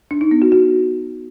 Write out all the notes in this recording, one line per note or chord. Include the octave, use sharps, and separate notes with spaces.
D4
D#4
B3
F#4
F#4